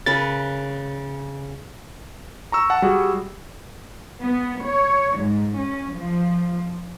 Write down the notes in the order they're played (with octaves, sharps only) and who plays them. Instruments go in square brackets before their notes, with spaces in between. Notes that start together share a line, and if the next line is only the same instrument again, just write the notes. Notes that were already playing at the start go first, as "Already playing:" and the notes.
[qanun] C#3 A#4 B4 [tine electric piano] A6
[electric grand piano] A#5 C#6 E6
F#5 A5
G3 F#4 G#4
[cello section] B3
C#5
G#2
C#4
F3